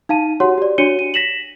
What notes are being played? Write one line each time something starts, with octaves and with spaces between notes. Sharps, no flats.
D#4 F5 A5 D#7
F#4 G4 C#5 F#5 C6
G4 D5
D4 F#4 C#5 C#7 D#7 G7
D#7
A#6 B6 E7 F#7